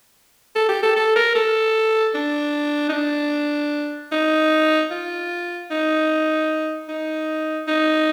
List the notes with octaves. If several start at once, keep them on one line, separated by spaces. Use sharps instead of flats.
A4
G4
A4
A4
A#4
A4
D4
D#4
D4
D#4
F4
D#4
D#4
D#4